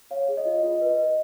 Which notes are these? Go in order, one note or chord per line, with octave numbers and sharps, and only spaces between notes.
C#5 F5
G#4
D#5
F4
F4 D#5
B4
D#5
B4